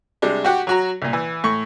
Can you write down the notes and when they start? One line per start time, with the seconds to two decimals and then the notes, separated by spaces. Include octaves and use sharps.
0.22 C3 G3 G#3 D4
0.44 F#4 G4 F#5
0.67 F#3 F#4 A#5
1.02 C2 A#2
1.13 E3
1.44 A2 C#6